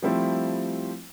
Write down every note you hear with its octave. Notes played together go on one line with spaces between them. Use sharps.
F3 G3 A3 C4 E4